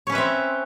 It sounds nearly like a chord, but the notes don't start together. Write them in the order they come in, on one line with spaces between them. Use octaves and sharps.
C#5 C#4 B4 E5 C4